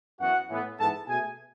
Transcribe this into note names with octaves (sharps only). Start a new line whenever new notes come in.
F#2 E3 B3 F#4 F#5
A2 E3 B3
G#2 E3 B3 A4 A5
B2 A3 G#4 G#5